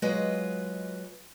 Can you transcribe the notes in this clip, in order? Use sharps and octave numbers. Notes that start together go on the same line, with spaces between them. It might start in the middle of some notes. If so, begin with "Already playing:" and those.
F#3 G#3 F4 B4 D#5